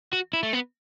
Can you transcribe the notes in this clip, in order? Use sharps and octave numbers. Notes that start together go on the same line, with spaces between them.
F#4
E4
A3
B3